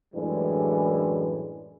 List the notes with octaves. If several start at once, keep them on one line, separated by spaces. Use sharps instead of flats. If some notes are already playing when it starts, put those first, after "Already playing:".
F#2 A2 E3 G3 G#3 D4